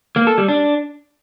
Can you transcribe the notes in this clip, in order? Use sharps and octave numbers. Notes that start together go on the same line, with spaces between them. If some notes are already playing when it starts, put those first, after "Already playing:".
A#3
A4
G3
D4